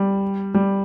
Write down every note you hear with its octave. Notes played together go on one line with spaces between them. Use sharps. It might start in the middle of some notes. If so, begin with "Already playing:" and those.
Already playing: G3
G3